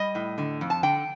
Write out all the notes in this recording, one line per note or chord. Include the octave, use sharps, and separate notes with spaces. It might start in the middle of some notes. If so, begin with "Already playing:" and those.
Already playing: G3 D#5
A2
D3
F2
A5
D3 G5